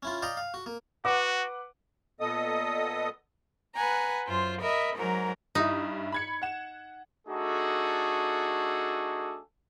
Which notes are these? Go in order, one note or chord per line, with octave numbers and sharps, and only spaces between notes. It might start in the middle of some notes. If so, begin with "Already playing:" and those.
C#4 E4 F4
D5 D#5 F5 G5 A#5
F5
F#4
A#3
F#4 B4 F#5 D6
A#2 B3 A4 D#5 D#6
B4 F#5 G#5 A#5
F#2 F4 C5
A#4 D#5 E5 B5
G#2 F#3 A#4 A#5
G2 D#4 E4
B5 G#6 C#7
F#5 E7
A3 D4 D#4 F#4 G#4 A4